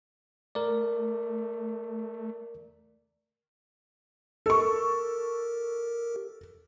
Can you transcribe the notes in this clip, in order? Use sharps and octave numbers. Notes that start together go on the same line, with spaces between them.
A3 A#4 D5
G4 A4 A#4 C#6